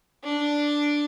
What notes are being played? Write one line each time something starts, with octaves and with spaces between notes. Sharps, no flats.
D4